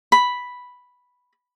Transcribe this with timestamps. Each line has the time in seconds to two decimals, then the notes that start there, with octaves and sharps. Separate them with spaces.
0.12 B5